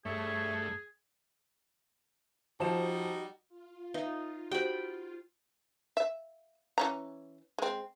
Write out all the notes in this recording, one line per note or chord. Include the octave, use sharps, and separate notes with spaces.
G2 A3 G#4 C#5 E5 C#6
F3 G3 D#4 F#4 C5 E7
F4
D#4 B4 E5 F5
F#4 G4 C5 G5 B5
E5
E3 C#4 A#5
G#3 C4